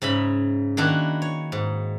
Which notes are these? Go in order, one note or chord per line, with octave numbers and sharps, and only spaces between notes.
G#2 C#3 E5 B5
D#3 A#3 D4 E4 F#4
C#5
G#2